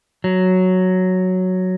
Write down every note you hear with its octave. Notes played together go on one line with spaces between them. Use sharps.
F#3